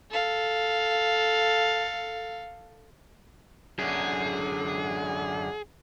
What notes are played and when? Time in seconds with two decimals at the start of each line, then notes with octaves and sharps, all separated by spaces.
0.11 A4 F5
3.79 F#2 D3 G#4